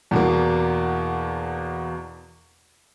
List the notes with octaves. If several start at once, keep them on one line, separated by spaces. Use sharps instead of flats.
E2 B2 A#3